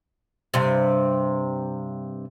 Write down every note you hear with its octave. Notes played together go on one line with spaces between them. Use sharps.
G2 C3